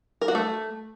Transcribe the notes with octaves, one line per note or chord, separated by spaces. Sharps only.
A#4
F#4
A3